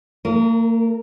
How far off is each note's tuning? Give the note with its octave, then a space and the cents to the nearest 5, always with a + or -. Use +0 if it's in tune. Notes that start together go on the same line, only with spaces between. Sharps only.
A#3 -40 A#4 +0